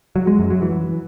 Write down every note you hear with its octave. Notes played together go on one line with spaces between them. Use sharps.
F#3
G#3
F#2
F#3
E3